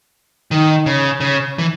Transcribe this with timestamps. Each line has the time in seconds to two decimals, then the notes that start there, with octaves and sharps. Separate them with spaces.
0.51 D#3
0.86 C#3
1.20 C#3
1.58 E3